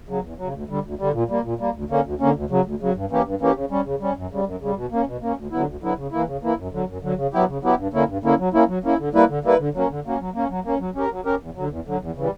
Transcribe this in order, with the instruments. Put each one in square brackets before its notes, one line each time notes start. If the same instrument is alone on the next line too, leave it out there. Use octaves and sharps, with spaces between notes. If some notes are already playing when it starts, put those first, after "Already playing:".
[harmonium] C#3 F#3
E2
F#3
C#3
D2
D3 G3
D2
D3 G3
A#2
G3 A#3
A#2
G3 A#3
D2
D3 A#3 C#4
D2
D3 A#3 C#4
D2
C#3 F#3
D2
C#3 F#3
G2
E3 A#3 C#4 G4
G2
E3 A#3 C#4 G4
C#3
G3 C#4
C#3
G3 C#4
F#2
C#3 G3
F#2
C#3 G3
B2
A#3 C#4
B2
A#3 C#4
D2
D3 F#3 B3 E4
D2
D3 F#3 B3 E4
C#3
E3 A#3 E4
C#3
E3 A#3 E4
F#2
D3 F#3
F#2
D3 F#3
C#3
F#3 B3 E4 G4
C#3
F#3 B3 E4 G4
G2
D3 A#3 C#4 E4
G2
D3 A#3 C#4 E4
F#3
A#3 C#4 E4
F#3
A#3 C#4 E4
D3
G3 A#3 E4 B4
D3
G3 A#3 E4 B4
D3
F#3 A#3 C#4
D3
F#3 A#3 C#4
F#3
A#3 C#4
F#3
A#3 C#4
F#3
C#4 G4 A#4
F#3
C#4 G4 A#4
E2
D3 F#3
E2
D3 F#3
E2
C#3 E3 G3